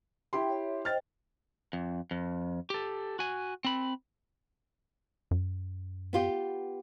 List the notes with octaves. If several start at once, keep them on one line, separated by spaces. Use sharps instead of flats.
E4 G4 G5 C6
C#5 E5
C5 D#5 G5 F6 A6
F2
F2
G4 A4
F#4 G#5
C4 B5
F#2
B3 F4 G4